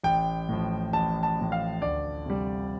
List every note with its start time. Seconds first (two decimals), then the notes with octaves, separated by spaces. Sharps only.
0.04 A1 G5
0.49 A2 F3
0.93 A1 A5
1.23 A5
1.38 A2 F3
1.52 F5
1.82 D2 D5
2.26 C3 G3